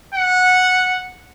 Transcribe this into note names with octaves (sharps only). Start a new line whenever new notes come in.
F#5